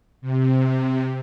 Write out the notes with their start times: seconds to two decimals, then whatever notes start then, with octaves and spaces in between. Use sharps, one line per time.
0.21 C3